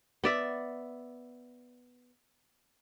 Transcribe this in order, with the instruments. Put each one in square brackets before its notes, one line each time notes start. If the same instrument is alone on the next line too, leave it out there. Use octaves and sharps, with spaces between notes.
[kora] B3 D5 E5